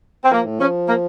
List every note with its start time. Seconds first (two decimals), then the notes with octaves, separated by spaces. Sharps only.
0.24 C4
0.31 F3 A#3
0.46 A2
0.60 F3 C#4
0.88 A#3